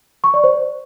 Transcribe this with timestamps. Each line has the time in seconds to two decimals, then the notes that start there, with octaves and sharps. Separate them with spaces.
0.24 C#6
0.34 D5
0.44 C5